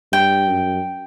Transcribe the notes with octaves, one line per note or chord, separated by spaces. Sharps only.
G2 G5
F#2